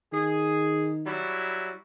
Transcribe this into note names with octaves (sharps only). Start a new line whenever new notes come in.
D#3 G#4
F#3 G3 E4